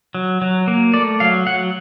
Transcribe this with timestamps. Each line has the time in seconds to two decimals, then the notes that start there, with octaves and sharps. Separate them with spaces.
0.15 F#3
0.42 F#3
0.68 A#3
0.94 A3 D5
1.20 F#3 F5
1.47 F#3 F#5